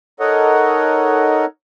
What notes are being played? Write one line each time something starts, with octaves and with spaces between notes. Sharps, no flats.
D#4 A4 A#4 C#5 D#5 F#5